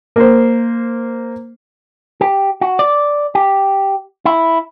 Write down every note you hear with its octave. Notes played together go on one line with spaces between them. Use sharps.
A#3 C5
G4
F#4
D5
G4
E4